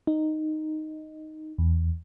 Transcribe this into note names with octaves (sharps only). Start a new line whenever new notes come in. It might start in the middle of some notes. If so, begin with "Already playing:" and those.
D#4
E2